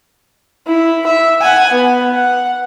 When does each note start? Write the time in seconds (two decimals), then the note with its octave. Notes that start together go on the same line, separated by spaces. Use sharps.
0.67 E4
1.06 E5
1.41 F#5 G#5
1.72 B3
2.14 F#5